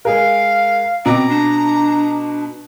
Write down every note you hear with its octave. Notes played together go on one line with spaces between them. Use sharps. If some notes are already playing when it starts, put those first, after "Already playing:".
G#3 G#4 A#4 F5
B2 C4 A#5 D6
D4